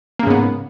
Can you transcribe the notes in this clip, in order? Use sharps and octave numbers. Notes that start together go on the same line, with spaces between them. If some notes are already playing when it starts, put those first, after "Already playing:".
G#2 C#3 A#3 B3